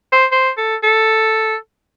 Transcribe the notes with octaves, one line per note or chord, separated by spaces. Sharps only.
C5
C5
A4
A4